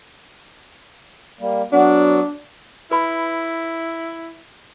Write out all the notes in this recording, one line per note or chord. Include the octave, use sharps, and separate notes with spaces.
G3 A#3
F#3 B3 D4 F#4
E4 B4 B5